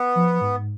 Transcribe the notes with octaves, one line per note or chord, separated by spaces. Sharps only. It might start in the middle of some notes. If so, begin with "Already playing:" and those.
Already playing: B3
F3
G#2